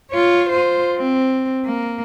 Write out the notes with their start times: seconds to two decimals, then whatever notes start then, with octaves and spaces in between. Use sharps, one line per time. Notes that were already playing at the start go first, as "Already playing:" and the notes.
0.11 F4 C#5
0.50 F4 C5
0.97 C4
1.65 A#3